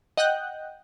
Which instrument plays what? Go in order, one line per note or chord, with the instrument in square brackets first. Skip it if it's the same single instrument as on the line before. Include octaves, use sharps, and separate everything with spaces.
[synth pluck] D#5 F#5 G5 F#6 G6